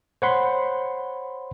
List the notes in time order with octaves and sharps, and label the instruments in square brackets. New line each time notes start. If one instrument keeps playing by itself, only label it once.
[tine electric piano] C5 C#5 F#5 B5 C6